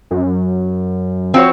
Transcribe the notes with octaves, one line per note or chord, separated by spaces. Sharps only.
F#2
F3 C4 F#4 C#5